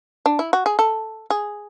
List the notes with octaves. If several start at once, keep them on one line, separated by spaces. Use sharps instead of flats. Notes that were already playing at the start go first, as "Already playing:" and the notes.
D4
E4
F#4
G#4
A4
G#4